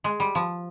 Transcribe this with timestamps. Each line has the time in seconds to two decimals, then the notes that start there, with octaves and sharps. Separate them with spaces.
0.04 G#3
0.20 G3
0.35 F3